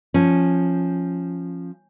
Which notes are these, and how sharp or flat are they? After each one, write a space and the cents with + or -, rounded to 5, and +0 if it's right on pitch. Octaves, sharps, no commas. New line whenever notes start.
F3 +0 C#4 -10